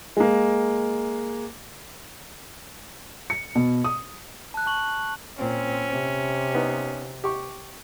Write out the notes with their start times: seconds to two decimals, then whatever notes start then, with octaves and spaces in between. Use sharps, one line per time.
0.17 G#3 A#3
3.30 C#7
3.55 B2
3.84 D#6
4.54 A5 F#6
4.66 A5 C#6 F#7
5.39 A#2 C4 C#4
5.88 C3
6.54 B3 D#4
7.24 G4 C#6